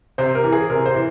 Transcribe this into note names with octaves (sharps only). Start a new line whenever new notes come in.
C3 C5
A#4
E3
G#4
C3 A#4
C5
E3